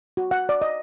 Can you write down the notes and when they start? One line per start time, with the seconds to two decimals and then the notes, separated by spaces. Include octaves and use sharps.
0.17 F#4
0.31 F#5
0.49 D5
0.62 D#5